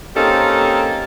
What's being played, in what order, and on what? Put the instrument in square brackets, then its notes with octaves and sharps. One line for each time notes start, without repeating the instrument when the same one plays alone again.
[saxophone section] A#3 C4 C#4 D#4 G4 A4